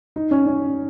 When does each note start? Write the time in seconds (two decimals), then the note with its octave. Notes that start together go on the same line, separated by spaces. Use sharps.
0.16 D#4
0.31 C#4
0.46 C#4